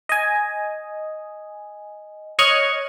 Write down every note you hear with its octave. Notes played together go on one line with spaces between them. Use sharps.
D#5 G#5
C#5 D#5 C#6 F6 F#6 G#6